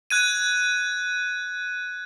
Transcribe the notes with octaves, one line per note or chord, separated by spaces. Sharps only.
F#6 G#6 D#7